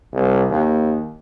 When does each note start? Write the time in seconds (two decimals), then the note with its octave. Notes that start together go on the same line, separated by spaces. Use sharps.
0.13 C2
0.50 D#2